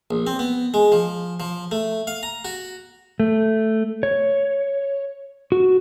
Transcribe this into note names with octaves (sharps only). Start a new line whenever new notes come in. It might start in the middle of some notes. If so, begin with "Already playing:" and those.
A#1
C4
B3
G#3
F3
F3
A3
F5
A#5
F#4
A3
C#5
F#4